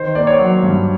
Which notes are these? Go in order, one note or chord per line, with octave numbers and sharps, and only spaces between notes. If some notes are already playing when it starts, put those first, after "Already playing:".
Already playing: D#3 C5
A#3 D5
C#5
F#3
G2